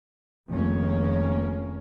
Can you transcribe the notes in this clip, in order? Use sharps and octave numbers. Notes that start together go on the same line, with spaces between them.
F1 C#2 D#3 A#3 C#4